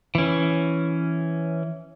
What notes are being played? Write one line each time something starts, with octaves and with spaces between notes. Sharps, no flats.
E3 C#4